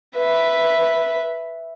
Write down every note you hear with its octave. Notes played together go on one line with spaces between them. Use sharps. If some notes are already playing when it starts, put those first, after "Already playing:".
B4 E5